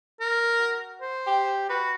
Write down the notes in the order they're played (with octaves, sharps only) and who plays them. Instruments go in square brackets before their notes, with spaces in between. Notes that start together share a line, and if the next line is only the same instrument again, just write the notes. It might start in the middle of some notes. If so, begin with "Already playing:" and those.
[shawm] A#4
[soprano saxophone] F#4
[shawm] C5
[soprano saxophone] G4
[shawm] F#4 [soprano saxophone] B4